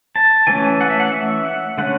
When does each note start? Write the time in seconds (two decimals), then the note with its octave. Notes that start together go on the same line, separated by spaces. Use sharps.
0.16 A5
0.47 E3 A3 C#4 G#5
0.81 F#5
0.90 E5
1.00 F#5
1.12 E5
1.45 F#5
1.78 D3 A3 C#4 F#5